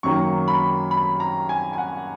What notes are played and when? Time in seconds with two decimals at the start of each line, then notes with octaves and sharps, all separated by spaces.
0.03 F#2 D#3 F#3 A#3 C#6
0.48 B5
0.91 B5
1.20 A#5
1.49 G#5
1.73 G#5
1.78 F#5